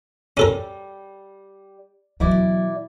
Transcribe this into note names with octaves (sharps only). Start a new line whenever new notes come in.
G3 C#4 A4 A#4
B2 E3 F#3 E4 D5